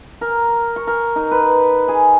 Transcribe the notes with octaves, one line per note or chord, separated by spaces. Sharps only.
A#4
C#6
A#4
D#4
B4
G#4